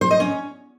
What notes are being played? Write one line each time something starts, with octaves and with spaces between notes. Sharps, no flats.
C5
D#5
C#4